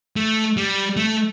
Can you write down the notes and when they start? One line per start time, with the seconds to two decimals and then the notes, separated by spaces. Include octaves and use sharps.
0.16 A3
0.57 G3
0.97 A3